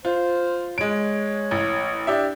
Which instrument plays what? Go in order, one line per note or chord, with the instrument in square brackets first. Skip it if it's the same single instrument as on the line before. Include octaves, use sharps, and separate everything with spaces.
[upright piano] F4 [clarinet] C5
[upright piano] G#3 D7 [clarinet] C#5
[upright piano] A1
D4 G4 E5